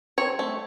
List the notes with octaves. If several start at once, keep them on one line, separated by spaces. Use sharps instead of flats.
C4 C#5
A3